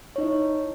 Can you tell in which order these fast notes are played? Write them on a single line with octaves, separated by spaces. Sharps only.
C#5 D#4 D#5 E4